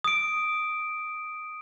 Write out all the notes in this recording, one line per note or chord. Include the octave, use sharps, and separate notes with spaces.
D#6 D7